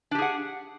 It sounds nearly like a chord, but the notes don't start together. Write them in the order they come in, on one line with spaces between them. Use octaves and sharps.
D4 G4 G#4 F#5